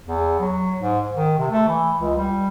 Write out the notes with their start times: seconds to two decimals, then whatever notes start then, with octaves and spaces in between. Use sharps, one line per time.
0.06 E2
0.40 F#3
0.78 G#2
1.14 D#3
1.38 C3
1.50 A3
1.68 E3
1.98 C#2
2.17 G3